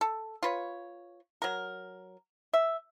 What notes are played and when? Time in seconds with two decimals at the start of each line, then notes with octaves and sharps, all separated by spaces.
0.01 A4
0.43 F4 B4 C#5
1.42 F#3 A#4
2.53 E5